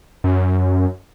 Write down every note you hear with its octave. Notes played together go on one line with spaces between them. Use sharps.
F#2